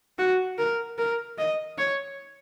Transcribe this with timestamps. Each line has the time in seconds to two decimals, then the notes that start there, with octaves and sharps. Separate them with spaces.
0.18 F#4
0.58 A#4
0.98 A#4
1.38 D#5
1.78 C#5